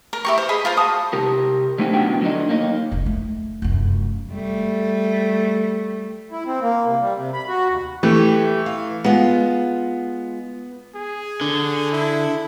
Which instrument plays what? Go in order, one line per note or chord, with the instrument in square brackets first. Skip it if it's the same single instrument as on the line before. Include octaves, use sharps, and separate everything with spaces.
[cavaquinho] A#4
E4 G4 C#6
C5
G#4 D#5 B5
F4 A#4 C5
F#4 A5 D#6
[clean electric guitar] C3 G4 A#4
G3 A3 C4 D#4 G4
B1 A2 B3 D4 F#4 G5
D3 F#3 D4 D#4
A#3 D#4
[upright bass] F1 E2
A3
F1 F#2
[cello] G3 A3
[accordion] E4
C4
A#3
C3
G3
C3
B5
F#4
D#2
[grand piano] E3 A3 [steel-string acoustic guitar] G4
[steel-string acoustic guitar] F5
[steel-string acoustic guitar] G#3 F4 [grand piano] B3
[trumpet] G#4
[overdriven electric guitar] D3
[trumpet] E4